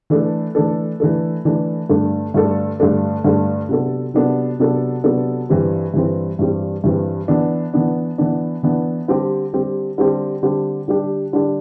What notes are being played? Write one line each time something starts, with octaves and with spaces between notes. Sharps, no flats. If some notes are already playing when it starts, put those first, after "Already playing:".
E3 A3 D4 A4
E3 A3 D4 A4
E3 A3 D4 A4
E3 A3 D4 A4
G2 D3 A3 D4 A4
G2 D3 A3 D4 A4
G2 D3 A3 D4 A4
G2 D3 A3 D4 A4
C3 F#3 B3 D4 A4
C3 F#3 B3 D4 A4
C3 F#3 B3 D4 A4
C3 F#3 B3 D4 A4
G2 E3 G3 C4
G2 E3 G3 C4
G2 E3 G3 C4
G2 E3 G3 C4
E3 B3 D4
E3 B3 D4
E3 B3 D4
E3 B3 D4
D3 G3 C4 G4
D3 G3 C4 G4
D3 G3 C4 G4
D3 G3 C4 G4
D3 G3 D4 G4
D3 G3 D4 G4